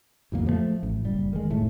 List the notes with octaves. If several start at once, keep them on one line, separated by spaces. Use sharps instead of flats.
A1 F2 D3 A#3
F3 G3 A3
A1
F#1 G3
D#3 G#3
F1 A2 A3